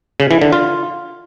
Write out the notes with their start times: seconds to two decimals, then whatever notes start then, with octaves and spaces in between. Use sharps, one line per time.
0.20 C#3
0.31 E3
0.42 D3
0.52 F4